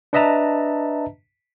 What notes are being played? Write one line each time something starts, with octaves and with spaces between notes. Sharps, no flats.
D4 B4 D#5 E5 A5 A#5